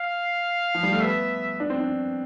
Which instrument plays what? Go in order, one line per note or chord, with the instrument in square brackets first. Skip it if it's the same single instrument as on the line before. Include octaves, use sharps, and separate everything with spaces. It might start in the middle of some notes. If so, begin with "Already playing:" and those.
Already playing: [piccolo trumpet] F5
[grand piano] F3
G3
A3
[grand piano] B3 [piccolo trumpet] E5
[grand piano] D4
C4
D4